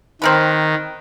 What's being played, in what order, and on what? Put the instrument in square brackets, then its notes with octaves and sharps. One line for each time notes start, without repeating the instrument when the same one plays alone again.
[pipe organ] D#3 [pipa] C4 A#4 B4